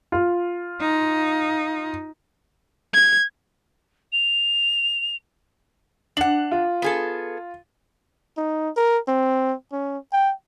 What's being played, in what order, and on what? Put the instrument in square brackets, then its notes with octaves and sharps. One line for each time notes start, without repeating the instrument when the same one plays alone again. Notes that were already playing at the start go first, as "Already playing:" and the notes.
[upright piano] F4
[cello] D#4
[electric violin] G#6
[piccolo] F7
[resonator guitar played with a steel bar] D4 F#5 [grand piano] F#7
[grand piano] F4
[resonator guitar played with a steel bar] B3 G#4 A4
[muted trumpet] D#4
A#4
C4
C#4
G5